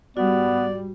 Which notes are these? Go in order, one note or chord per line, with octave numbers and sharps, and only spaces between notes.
G#2 G3 B3 F#4 D5